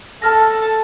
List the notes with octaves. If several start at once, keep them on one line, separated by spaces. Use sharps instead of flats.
A4 A5 F6 A#6